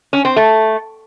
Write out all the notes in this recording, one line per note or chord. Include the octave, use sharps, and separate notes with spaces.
C#4
C4
A3